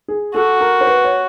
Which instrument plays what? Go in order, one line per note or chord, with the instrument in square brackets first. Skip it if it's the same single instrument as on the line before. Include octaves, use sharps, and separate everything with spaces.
[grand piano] G#4
[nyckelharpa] F#4 [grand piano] A4
[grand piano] A#4
C5
B4
C#5